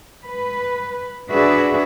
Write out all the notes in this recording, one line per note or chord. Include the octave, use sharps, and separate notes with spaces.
B4
D4 F#4 G#4 B4 E5